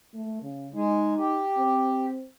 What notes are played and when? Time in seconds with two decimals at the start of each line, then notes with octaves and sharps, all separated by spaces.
0.14 A3
0.43 C#3
0.74 G#3 D#4
1.18 G4
1.58 C4